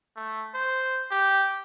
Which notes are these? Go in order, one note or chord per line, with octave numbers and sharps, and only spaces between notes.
A3
C5
G4